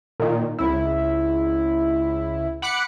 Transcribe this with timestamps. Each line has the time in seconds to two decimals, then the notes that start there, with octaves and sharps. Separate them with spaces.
0.20 A#2 D#3
0.58 C#2 E4
2.62 F#5 B5 D6 F#6 C#7